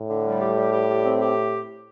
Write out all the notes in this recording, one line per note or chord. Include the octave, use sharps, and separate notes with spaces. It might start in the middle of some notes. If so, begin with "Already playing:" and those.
Already playing: A2
D3
G3
G4
G3
G4
G3
C4
G4